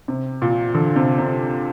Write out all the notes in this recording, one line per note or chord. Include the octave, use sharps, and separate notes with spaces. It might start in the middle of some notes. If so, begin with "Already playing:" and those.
C3
A#2
D3
C3
C3